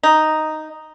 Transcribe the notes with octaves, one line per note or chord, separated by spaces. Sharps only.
D#4